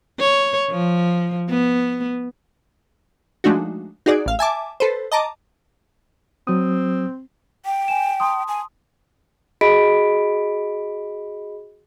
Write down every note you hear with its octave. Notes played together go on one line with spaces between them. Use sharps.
C#5
F3
B3
F3 G#3 A3 D4 D#4 F#4
D#4 F#4 G#4 D5
A1 F5
E5 G#5 A5 D6
A4 B4 C5
D#5 A5 A#5 D6
F#3 C4 D#6
G5
G#5 E7
A5 C6 D#6
G#5
F#4 G#4 D#5 B5 B6 D7